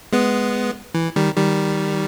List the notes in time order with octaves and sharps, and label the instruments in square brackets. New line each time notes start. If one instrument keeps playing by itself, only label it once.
[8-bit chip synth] G#3 B3
E3
D#3 G3
D#3 G3